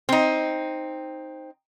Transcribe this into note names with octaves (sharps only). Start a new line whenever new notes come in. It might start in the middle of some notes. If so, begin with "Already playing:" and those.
C4 D#4